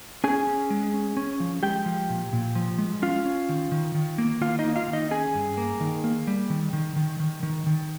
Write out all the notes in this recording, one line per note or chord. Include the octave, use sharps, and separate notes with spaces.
C#4 G#4 G#5
C#4
G#3
C#4
C#4
F3
G#3 G4 G5
F3
A#2
A#2
F3
G#3
C#4 F4 F5
C#4
D#3
D#3
D#3
A#3
D#3 F4 F5
D#4 D#5
A#3
F4 F5
D#3
D#4 D#5
C#4 G#4 G#5
G2
A#3
D#3
A#3
G3
D#3
D#3
D#3
D#3
D#3
D#3